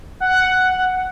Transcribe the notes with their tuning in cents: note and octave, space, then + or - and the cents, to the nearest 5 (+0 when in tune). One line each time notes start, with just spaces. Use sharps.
F#5 +5